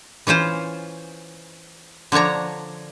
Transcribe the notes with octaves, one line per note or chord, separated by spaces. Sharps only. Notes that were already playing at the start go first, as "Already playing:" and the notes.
E3 C#4 F4 C5
D3 F3 D4 C#5 A#5